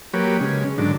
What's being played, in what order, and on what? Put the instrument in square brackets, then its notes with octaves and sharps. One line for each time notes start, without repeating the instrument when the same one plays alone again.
[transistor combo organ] F#3 A#3 G4 B4 C#5
C#3 G#3 C#4
G#2 D3 D#3 F#3 D4